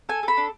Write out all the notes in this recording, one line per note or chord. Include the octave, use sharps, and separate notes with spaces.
A4 G#5
A4 B5
D4